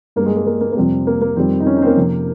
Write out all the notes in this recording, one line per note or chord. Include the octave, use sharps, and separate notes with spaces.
G2 G3 A#3
G#3
A#3
A#3
A#3
A#3
F2 C3 G3 C4
A#3
A#3
F2 D#3 G3 C4
D#4
C#4
D#4
C4
A#3
F2 C3 F3